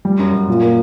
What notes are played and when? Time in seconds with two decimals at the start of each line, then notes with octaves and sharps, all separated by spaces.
0.05 G3
0.19 F#2
0.34 F#2
0.48 A#2
0.62 A#3